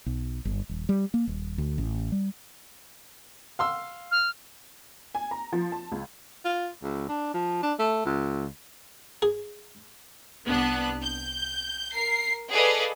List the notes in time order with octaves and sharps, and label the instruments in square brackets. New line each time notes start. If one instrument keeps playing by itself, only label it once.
[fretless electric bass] B1
G1
D#1
G3
A#3
D#1
D2
A1
G3
[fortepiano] F5 C6 E6
[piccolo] F6
[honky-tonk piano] G#5
A#5
F3
A5
C#2
[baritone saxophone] F4
C#2
D4
F3
D4
A3
C#2
[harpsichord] G#4
[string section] C2 B3 D4 F#6
G6
A#4 C7
G#4 A4 B4 D5 D#5 F5